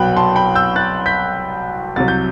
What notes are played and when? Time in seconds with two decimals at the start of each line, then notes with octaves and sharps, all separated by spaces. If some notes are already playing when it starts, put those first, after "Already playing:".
Already playing: C2 B2 F#3 G5 B5 F#6
0.16 A5 C6
0.36 G5 B5
0.55 E6 G6
0.76 F#6 A6
1.06 G6 B6
1.96 C2 C3 F#3 A6
2.08 G6